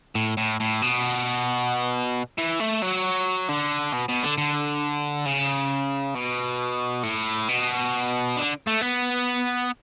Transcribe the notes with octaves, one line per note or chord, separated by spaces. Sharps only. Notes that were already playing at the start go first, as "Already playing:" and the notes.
A2
A2
A2
B2
E3
A3
F#3
D3
B2
B2
D3
D3
C#3
B2
A2
B2
D3
A3
B3